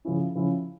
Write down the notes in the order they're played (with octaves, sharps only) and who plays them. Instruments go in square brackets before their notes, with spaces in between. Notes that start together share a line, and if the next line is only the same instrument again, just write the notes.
[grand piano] C#3 F3 C#4 E4
C#3 F3 C#4 E4